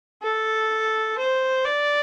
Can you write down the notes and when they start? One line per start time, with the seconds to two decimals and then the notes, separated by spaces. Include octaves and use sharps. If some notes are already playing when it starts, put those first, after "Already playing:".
0.22 A4
1.18 C5
1.65 D5